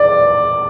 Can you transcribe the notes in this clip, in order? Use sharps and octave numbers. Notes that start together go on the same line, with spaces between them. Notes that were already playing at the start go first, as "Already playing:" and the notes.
Already playing: D5